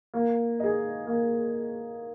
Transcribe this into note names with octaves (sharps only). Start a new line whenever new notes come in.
A#3
G#4 D#5
A#3